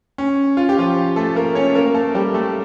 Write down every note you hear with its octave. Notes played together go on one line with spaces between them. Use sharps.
C#4
F4
G4
F3 F4
A3 A4
A#3 A#4
C#4 C#5
A#3 A#4
A3 A4
G3 G4
A3 A4